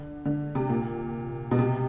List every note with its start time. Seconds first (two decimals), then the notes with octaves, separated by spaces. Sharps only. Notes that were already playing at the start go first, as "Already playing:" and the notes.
Already playing: D3
0.25 D3
0.55 C3
0.70 A#2
1.51 B2
1.59 C3